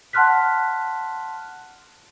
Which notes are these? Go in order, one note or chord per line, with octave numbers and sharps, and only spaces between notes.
F#5 A5 C6 F6 F#6 B6